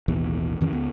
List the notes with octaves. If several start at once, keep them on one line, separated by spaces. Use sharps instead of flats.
A1 D#2 B2 E3
F2 D#3 E3 C#4
C#2 B3